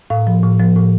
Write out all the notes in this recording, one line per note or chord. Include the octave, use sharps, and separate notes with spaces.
A2 F5
F3
A2
F3
A2